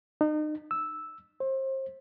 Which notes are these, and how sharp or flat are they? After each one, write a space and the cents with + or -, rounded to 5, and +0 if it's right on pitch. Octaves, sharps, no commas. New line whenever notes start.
D#4 -35
E6 -5
C5 +30